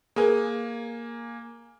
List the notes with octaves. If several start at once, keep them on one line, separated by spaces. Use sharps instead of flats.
A#3 G#4 A#4 B4 G#5